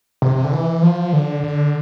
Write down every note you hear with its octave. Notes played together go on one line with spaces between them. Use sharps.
C3
C3
D3
E3
F3
D3
D3